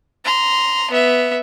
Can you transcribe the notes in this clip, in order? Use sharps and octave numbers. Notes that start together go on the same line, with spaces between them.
A#5 C6
B3 E5